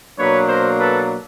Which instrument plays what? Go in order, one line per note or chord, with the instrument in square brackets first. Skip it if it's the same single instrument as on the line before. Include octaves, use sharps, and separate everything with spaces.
[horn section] B2 F#3 A#3 D4 B4 C#5
A#4 C5
A4 B4